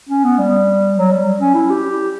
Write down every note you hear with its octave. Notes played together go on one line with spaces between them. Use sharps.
C#4
B3
G3
F#3
G3
C#4
E4
G4